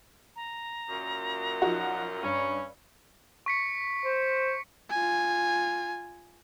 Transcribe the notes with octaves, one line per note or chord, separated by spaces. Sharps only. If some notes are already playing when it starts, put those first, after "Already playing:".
A#5
F#2 A#2
F3 D#4 F#4
G2 C#4
C#6 B6 C#7
C5
F4 G#5